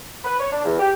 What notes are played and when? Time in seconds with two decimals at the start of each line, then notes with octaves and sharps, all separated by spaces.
0.25 B4
0.40 C#5
0.52 D4
0.64 E2
0.79 G4